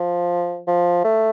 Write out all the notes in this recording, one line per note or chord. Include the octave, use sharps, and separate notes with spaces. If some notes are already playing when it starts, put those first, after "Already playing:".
Already playing: F3
F3
A3